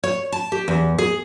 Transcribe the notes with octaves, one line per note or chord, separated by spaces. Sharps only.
C#5
A5
G4
E2
G#4